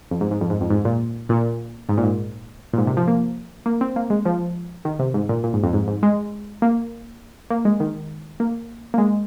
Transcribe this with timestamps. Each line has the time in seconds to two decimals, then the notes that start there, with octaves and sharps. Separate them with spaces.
0.11 F2
0.21 G#2
0.31 G#2
0.41 F2
0.50 G#2
0.61 F2
0.70 G#2
0.85 A#2
1.29 A#2
1.89 G#2
1.98 A#2
2.04 G#2
2.73 A#2
2.78 G#2
2.87 C3
2.97 F3
3.08 A#3
3.66 A#3
3.81 C4
3.96 A#3
4.10 G#3
4.25 F3
4.85 D#3
4.99 C3
5.14 G#2
5.29 A#2
5.44 A#2
5.53 G#2
5.64 F2
5.73 G#2
5.88 G#2
6.03 G#3
6.62 A#3
7.50 A#3
7.65 G#3
7.80 D#3
8.40 A#3
8.94 A#3
8.98 G#3